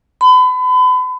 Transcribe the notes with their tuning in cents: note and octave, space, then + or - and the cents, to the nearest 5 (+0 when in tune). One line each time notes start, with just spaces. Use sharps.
B5 +35